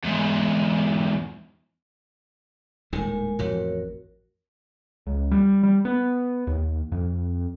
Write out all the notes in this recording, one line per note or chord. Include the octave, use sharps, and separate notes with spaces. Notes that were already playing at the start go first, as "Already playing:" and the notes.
E2 G#2
D#1 A2 D#3 G#3 A#4 G#5
A1 F2 A2 F#4 A#4 C#5
C#2
G3
G3
B3
D#2
F2